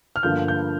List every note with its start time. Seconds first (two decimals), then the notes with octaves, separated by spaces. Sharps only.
0.16 F6
0.23 G1 G2 D3 F3 A#3 G6
0.48 G6